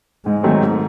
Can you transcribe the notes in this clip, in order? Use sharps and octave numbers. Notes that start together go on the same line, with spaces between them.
G#2 G#3
D#3 F#3 A3 C4
G#2